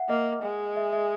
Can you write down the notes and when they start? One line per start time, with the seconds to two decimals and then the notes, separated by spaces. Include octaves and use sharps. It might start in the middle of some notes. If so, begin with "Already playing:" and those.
Already playing: E5 F#5
0.09 A#3 D#5
0.43 G#3
0.77 E5
0.93 E5